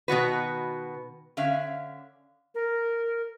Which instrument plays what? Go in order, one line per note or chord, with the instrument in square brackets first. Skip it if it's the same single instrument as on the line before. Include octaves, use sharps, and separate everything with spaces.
[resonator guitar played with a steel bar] B2 D#3 F#4 B4
D3 C#4 E5 F5
[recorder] A#4